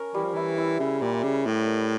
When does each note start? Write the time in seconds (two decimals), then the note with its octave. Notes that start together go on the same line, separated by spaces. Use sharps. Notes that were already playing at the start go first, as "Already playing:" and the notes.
Already playing: C#4 A#4
0.14 E3 G3
0.25 F3
0.34 E3 E4
0.58 E4
0.79 C#3 E4
1.02 A#2 G3
1.23 C#3 G3
1.45 A2 E5
1.67 A#4